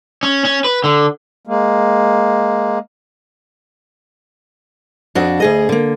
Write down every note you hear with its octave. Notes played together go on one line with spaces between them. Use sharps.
C#4
C#4
B4
D3
G#3 A#3
F2 D4 F#4
D2 G#4 D#5
D3 A#3